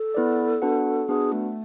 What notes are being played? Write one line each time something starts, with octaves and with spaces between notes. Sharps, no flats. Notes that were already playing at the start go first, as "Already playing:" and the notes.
Already playing: A4
B3 E4 B4 D5
B3 D4 F#4 B4 F#5
B3 D4 F#4 G#4 B4 F#5
A3